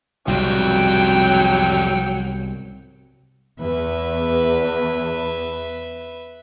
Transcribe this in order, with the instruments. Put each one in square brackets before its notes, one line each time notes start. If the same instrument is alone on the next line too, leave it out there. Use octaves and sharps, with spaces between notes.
[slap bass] C2 G#2 B2 [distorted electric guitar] F2 G3 [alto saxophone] F#3 [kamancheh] G5
[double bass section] E2 [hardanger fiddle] B4 E5